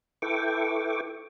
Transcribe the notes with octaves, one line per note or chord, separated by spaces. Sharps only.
E4 A4 B4 G5 C#6 D6